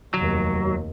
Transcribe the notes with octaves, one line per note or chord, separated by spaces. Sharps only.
F1 D#2 F#3